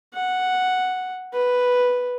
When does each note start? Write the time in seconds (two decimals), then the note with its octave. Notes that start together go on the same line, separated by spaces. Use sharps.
0.14 F#5
1.33 B4